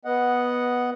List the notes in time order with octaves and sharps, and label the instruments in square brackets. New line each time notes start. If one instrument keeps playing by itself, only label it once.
[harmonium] B3 D#5 F#5